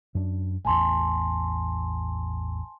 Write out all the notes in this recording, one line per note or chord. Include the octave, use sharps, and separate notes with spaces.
F#2 D4
A1 E2 G#5 A5 C6